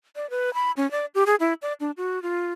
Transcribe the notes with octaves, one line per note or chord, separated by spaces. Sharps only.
D5
B4
B5
C#4
D5
G4
G#4
E4
D5
D4
F#4
F4